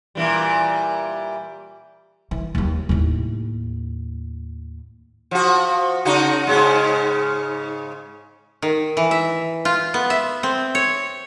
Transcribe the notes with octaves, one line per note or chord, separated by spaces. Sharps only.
A#2 E3 G3
E3
D#2 F#3
D#2 A2
F3 F#4
C#3 D#4 F#4
G#2 C#3 G#3
D#3
E3
E5
F4
B3
E5
C4
C#5